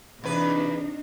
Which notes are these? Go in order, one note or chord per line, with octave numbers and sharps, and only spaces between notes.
E2 C3 D4 D#4 B4